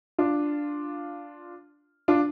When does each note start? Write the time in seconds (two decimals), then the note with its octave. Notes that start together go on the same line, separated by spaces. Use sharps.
0.18 D4 F4
2.08 D4 F4